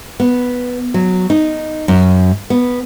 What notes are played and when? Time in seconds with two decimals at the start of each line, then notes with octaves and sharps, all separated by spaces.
0.20 B3
0.94 F#3
1.30 D#4
1.88 F#2
2.50 B3